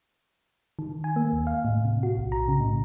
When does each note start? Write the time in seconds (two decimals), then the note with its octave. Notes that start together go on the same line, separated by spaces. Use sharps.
0.79 D#3
1.04 G#5
1.16 A#3
1.33 D#2
1.47 F5
1.65 A2
1.85 C3
2.03 F#4
2.18 B1
2.32 A#5
2.48 C#3
2.60 A2